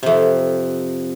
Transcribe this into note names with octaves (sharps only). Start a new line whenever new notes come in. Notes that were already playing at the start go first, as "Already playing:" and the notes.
F2 C3